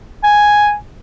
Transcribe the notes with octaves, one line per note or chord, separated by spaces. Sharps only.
G#5